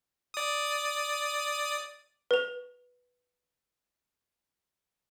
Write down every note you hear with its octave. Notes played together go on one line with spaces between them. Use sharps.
D5 D#6
B4 F7